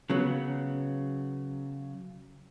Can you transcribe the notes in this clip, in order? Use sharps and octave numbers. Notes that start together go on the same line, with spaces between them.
C#3 F#3 B3